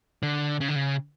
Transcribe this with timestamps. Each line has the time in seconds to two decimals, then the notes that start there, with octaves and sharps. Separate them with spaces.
0.23 D3
0.61 C#3
0.69 D3
0.76 C#3